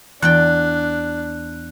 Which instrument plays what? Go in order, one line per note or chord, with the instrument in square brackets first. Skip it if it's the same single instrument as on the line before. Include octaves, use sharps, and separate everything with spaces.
[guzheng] E2 D5 G5 [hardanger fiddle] D4 [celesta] F#6